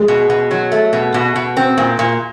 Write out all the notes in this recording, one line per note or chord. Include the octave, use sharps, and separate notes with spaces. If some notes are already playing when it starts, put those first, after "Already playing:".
Already playing: G#3
B2
B2
F#3
A3
B2
B2
B2
C4
A#2
A#2